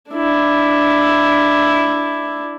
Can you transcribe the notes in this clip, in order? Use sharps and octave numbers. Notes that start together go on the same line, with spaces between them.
D4 E4